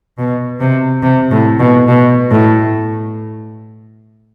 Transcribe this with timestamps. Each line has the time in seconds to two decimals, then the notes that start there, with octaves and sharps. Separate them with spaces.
0.18 B2
0.60 C3
1.03 C3
1.31 A2
1.60 B2
1.88 B2
2.31 A2